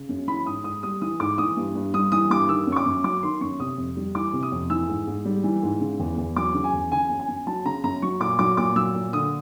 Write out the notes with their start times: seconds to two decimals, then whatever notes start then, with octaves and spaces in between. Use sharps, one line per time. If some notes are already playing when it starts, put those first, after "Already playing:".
Already playing: C#3
0.09 F#2
0.28 E3 B5
0.46 G#2 D#6
0.64 G#2 D#6
0.83 G3 D#6
1.02 E3 D#6
1.20 G#2 D6
1.38 E3 D#6
1.57 G2
1.75 G2
1.94 G3 D#6
2.12 E3 D#6
2.30 G2 D6
2.49 D#3 E6
2.67 F#2
2.72 C#6
2.76 D6
2.86 F#2
3.04 F#3 D6
3.23 D#3 C6
3.41 F#2 C#6
3.60 C3 D#6
3.78 F2
3.97 G3
4.15 E3 D6
4.33 C3
4.43 D#6
4.52 F2
4.70 E3 E6
4.89 G#2
5.07 G#2
5.25 G3
5.44 E3
5.63 G#2
5.81 C#3
6.00 E2
6.18 E2
6.36 F#3 D6
6.54 C#3
6.64 G#5
6.73 E2
6.92 C#3 G#5
7.10 F#2
7.20 G#5
7.28 F#2
7.47 F#3 A5
7.65 C#3 A#5
7.84 F#2 A#5
8.02 F#3 C#6
8.20 A#2 D6
8.39 F#3 D6
8.57 A#2 D6
8.76 F#3 E6
8.94 A#2
9.13 D3 D#6